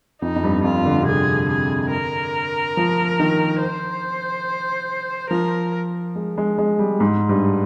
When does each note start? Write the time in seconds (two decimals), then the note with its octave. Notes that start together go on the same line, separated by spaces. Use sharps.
0.22 F2 D#4
0.36 F2
0.44 G2
0.64 F2 F4
0.85 D3
1.01 C3
1.07 D3 G#4
1.49 G#4
1.91 A#4
2.77 F3
3.20 D#3
3.61 C5
5.31 F3 A#4
6.15 G#3
6.38 G#3
6.58 G#3
6.79 G3
7.00 G#2
7.29 G2